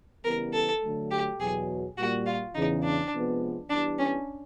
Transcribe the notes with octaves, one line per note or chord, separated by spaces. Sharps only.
C#3 E3 G3 B3 A#4
A4
D3 F#3 A3
G4
E2 B2 F#3 G#4
A#2 G3 A#3 F#4
F4
E2 C#3 E3 D#4
D4
C3 F3 G#3 B3
E3 G3 B3 D4 E4
C#4